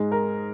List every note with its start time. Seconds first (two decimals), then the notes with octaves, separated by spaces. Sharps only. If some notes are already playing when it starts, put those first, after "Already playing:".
Already playing: G#2 G#3
0.12 A#4